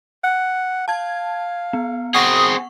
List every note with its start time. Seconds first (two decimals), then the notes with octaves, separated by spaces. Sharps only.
0.24 F#5
0.88 F5 A5 G#6
1.73 B3
2.14 C4 G#4 F#5 C#6 D#6